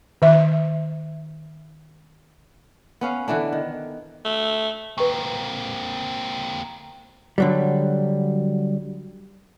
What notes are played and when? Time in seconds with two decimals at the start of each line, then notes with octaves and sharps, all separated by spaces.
0.22 D#3 E5
3.01 B3 C#4 F5
3.28 D3 E3 B3 D4
3.53 D#3
4.25 A3
4.98 A#3 C4 B4 C#6
7.38 D3 F#3 G3